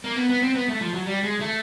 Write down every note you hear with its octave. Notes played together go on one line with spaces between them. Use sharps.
A#3
B3
B3
C4
B3
A3
F3
F#3
G3
G#3
A3